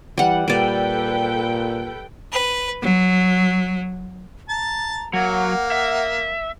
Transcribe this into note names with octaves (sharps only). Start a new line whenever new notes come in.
E3 G3 F#5
A#2 G3 A4 B4 D5 G5
B4
F#3
A5 A#5
F#3 A#3 F#5
E5